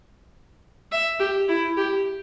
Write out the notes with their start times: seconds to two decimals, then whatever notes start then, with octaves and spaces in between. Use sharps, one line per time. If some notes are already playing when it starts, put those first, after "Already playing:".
0.92 E5
1.20 G4
1.48 E4
1.77 G4